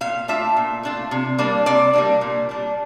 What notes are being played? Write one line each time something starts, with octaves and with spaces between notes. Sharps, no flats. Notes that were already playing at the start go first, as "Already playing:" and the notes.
A#2 F5
A3 D4 F4 E5
A#2
A3 D4 F4
C3
G3 A#3 D4
C3 D5
G3 A#3 D4
A#2
G3 D4